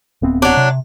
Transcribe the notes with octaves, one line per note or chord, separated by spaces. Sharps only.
D1 B3 C4
F#3 D4
C3